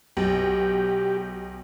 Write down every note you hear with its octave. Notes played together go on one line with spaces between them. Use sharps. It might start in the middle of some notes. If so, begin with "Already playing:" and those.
B1 G4